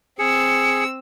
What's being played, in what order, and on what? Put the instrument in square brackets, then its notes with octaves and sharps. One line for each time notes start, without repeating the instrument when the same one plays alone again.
[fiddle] C4 E6 [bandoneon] G#4 [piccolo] C#7